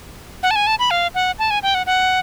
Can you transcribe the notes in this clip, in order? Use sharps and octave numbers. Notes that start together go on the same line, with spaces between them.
F#5
A5
G#5
A5
B5
F5
F#5
A5
G#5
G5
F#5
F#5